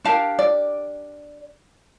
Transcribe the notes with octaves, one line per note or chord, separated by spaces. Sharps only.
D4 G4 A#4 F5 A5
D5